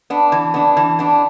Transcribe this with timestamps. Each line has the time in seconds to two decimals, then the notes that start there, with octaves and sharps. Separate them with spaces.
0.10 B3 D4
0.32 E3
0.54 B3 D4
0.77 E3
0.99 B3 D4